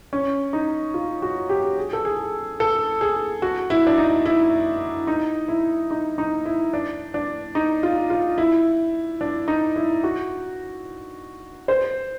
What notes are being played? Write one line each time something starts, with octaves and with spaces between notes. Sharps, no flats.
C#4
D#4
F4
F#4
G4
G#4
A4
G#4
A4
G#4
F#4
E4
D4
D#4
E4
D#4
E4
D#4
D#4
E4
D4
D4
D#4
F4
F4
E4
D4
D#4
E4
F#4
C5